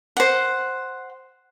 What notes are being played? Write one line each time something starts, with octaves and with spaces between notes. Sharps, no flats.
C5 F#5